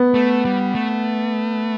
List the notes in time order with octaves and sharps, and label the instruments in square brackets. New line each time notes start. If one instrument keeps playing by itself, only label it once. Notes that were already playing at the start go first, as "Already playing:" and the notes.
Already playing: [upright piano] B3
[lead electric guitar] A3
G3
A3